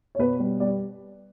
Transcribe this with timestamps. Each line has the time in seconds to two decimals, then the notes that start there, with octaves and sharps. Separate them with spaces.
0.15 C#5
0.19 B2 B4
0.39 G3
0.60 G3 D5